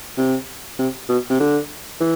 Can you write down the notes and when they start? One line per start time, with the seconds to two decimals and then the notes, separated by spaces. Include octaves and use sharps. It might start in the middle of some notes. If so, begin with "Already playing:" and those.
0.17 C3
0.79 C3
1.09 B2
1.30 C3
1.40 D3
2.00 E3